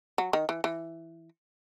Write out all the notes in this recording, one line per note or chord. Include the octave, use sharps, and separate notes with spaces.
F#3
D#3
E3
E3